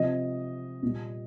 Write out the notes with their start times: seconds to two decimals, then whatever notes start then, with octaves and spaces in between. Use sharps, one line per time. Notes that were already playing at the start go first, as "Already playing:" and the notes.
Already playing: C3 F3 D#5
0.82 A#2 G3